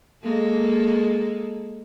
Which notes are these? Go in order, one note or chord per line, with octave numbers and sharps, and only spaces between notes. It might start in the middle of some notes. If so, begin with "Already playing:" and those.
G#3 A#3 A4